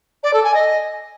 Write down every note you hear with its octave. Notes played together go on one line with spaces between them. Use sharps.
D5
A4
G#5
D#5